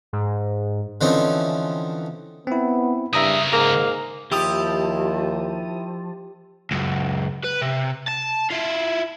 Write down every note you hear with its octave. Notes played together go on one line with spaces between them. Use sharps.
G#2
D3 E3 F3 C4 C#4 D#4
B3 C4 E4
G2 C#3 A#4 E5 A#5 D#6
G#2 A#3 G#4
D#2 F3 E4 G4 D#6
C#2 F#2
B4
C3
A5
E4 F4